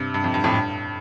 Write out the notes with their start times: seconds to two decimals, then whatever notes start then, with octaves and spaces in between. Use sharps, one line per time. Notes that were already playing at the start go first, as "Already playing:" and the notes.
Already playing: G2 C3
0.14 G2
0.24 F2
0.34 G2
0.44 F2 A2
0.54 G2